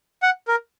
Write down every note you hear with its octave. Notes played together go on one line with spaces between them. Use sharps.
F#5
A#4